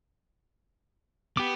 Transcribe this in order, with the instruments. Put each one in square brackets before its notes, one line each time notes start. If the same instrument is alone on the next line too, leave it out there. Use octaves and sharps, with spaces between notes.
[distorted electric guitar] B3 [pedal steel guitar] G4 D6